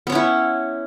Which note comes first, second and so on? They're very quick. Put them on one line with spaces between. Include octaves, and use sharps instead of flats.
B3 C#5 C#4 E4